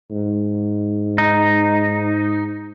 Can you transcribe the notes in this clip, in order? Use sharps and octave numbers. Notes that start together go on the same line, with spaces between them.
G#2
D#4